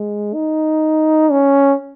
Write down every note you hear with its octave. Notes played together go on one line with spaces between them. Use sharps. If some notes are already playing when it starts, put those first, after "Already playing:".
Already playing: G#3
D#4
C#4